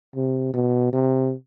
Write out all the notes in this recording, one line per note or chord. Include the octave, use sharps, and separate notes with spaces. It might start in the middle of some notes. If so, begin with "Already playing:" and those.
C3
B2
C3